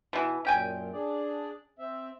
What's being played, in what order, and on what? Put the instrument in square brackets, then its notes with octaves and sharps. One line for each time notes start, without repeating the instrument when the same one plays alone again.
[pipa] B2 E3
[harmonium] F#2 A#2 [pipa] C#4 G5 G#5
[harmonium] D4 G#4 D5
C4 E5